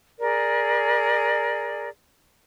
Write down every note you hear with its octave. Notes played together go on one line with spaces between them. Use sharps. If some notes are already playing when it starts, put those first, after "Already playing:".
G#4 A#4 D5